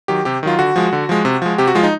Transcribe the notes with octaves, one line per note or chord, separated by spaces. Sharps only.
D#3 F#3 G4
C3 G4
D#3 F#3 F4
D3 F#4
F3 G#3
D3
F3 G#3
C3
F3 G#3
C3 G4
F#4
F3 G#3 F4
D#4